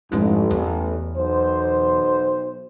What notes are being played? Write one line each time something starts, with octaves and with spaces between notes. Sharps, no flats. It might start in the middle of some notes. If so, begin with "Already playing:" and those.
A1 F2 G#2
E2
B1 C5